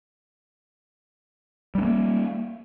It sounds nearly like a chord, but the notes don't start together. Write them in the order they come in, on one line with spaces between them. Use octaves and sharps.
G3 D4 A3 A#3